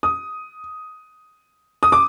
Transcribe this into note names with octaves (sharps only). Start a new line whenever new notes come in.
D#6
D#6
D6